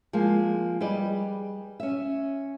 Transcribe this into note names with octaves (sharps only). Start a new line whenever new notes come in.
F3 G#3 A#3
G3 G#4 B4 D5 D#5
C#4 E5